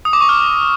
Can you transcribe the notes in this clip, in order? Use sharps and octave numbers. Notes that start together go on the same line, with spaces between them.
D#6
D6
C#6
F6